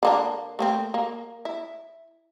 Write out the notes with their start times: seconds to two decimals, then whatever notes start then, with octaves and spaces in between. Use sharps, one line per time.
0.03 D3 A#3 D4
0.59 A3 A#3 C4
0.94 A#3
1.45 E4